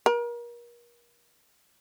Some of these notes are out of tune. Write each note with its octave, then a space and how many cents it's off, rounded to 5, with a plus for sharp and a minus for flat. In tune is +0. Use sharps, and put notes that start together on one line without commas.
A#4 +35